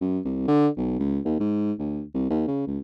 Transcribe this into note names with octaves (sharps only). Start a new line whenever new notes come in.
F#2
C2
D3
B1
C#2
D#2
G#2
D2
C2
D#2
C#3
C#2